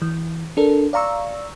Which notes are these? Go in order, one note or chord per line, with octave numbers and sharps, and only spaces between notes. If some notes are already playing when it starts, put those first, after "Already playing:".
E3
D4 A4 A#4
D5 F5 A#5 C#6 E6